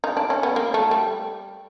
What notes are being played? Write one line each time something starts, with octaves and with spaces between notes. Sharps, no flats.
D#4
D4
C#4
B3
A#3
A3
G3